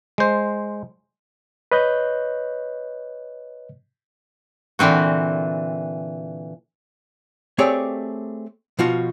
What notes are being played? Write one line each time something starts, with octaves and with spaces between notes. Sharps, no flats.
G#3 C5
B4 C#5 D#5 F#6 G6
A#2 D3 E3 C4 F#4
A3 C4 G4 G#4 C#5 D5
B2 F3 F4 F#4